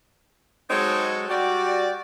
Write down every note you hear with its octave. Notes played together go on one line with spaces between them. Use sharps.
F#3 G#3 C4 D#4 A4 C#5
G3 F#4 G4 D5